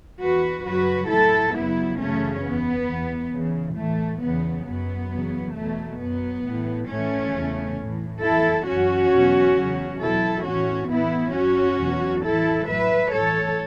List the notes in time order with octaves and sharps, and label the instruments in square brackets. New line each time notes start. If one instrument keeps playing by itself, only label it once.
[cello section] E2 E3 F#4 B4
F#2 C#3 F#3 F#4 B4
A2 F#3 E4 A4
F#2 C#3 F#3 B3 E4
F#2 C#3 E3 A3 C#4
E2 E3 B3
E2 E3
E2 C#3 E3
A2 E3 A3
E2 C#3 E3 B3
F#2 F#3 B3
E2 C#3 F#3
E2 B2 F#3 A3
F#2 F#3 B3
A2 E3
A2 E3 A3 C#4
E2 C#3 E3
A2 E3
E2 E3 E4 A4
F#2 E3 C#4 F#4
E2 B2 F#3
E2 C#3 F#3
E2 B2 F#3 E4 A4
A2 E3 C#4 F#4
A2 E3 B3 E4
F#2 F#3 C#4 F#4
E2 B2 F#3
A2 E3 E4 A4
A2 F#3 B4 E5
A2 E3 A4 C#5